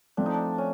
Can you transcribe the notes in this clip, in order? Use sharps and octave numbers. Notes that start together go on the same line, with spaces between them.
F3 A3 C4 D4
D#4
D4
C#4